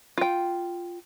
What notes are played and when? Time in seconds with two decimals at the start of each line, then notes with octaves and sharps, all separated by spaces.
0.18 F4 G5